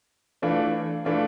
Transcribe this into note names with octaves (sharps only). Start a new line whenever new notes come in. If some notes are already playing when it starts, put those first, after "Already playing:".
E3 A3 D4 F4
E3 A3 D4 F4